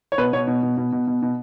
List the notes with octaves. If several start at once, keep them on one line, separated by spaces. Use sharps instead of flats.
C#5
B2 B4
B2 C#5
B2
B2
B2
B2
B2
B2